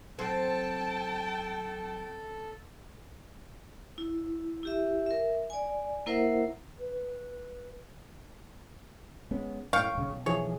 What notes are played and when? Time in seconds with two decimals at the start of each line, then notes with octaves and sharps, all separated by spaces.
0.19 F#3 C4 A4 G5 A5
3.98 E4
4.63 E4 G4 E5
5.06 A#4 E5
5.50 D5 G#5
6.06 A#3 E4 A#4 C5 E5 F#5
6.79 B4
9.31 G#3 B3 C#4
9.73 F#2 A2 C#5 F5 G5 C#6
9.95 D#1 C#3
10.10 B1
10.26 E3 F3 G#4 C#5